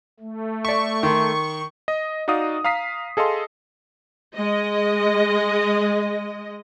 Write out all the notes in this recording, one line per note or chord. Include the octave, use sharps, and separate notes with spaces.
A3
D5 E5 C#6
D#3 C6
D#5
D#4 F#4 D5 F5 D#6
F5 A#5 D#6 B6 C7
G#4 A4 D#5 F5 C6
G#3 D#5